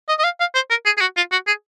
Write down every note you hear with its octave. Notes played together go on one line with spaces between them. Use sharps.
D#5
D#5
F5
F5
C5
A#4
G#4
G#4
F#4
F4
F#4
G#4